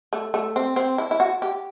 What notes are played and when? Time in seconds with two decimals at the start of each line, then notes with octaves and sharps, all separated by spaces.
0.13 A3
0.34 A3
0.56 C4
0.76 C4
0.98 E4
1.11 E4
1.20 F#4
1.42 G4